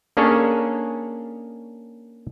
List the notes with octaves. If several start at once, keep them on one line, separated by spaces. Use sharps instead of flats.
A#3 C#4 D4 G#4 A4 C#5